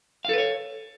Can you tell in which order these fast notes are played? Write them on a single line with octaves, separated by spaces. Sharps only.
F5 A4 B4 C#5